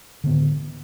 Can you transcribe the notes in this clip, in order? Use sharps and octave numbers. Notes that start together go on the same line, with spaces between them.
A2 D3 B3